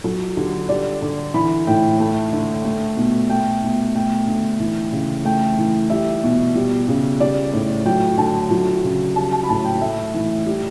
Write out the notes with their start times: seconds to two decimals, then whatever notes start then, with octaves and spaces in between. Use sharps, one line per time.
0.04 F#3 A4
0.37 D3 G4
0.69 G3 D5
1.02 D3
1.34 E3 B5
1.67 A2 G5
2.00 A3
2.33 D3
2.65 A3
2.97 B2
3.29 A3 G5
3.63 B2
3.95 A3 G5
4.27 D3
4.60 E3
4.92 C#3
5.25 A3 G5
5.58 E3
5.90 G3 E5
6.24 B2
6.55 G3
6.88 C#3
7.20 G3 D5
7.54 A2
7.86 F#3 G5
8.18 D3 A5
8.51 F#3
8.84 C#3
9.16 G3 A5
9.32 A5
9.44 B5
9.49 A2 A5
9.65 G5
9.81 A3 E5
10.15 E3
10.46 G3